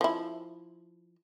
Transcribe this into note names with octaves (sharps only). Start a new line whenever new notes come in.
F3 E4